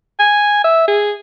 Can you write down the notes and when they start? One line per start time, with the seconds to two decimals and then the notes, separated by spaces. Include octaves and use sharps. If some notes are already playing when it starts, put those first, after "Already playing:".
0.19 G#5
0.64 E5
0.88 G#4